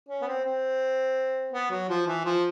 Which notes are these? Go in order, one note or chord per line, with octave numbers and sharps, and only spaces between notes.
C#4
B3
C4
C4
B3
F#3
F3
E3
F3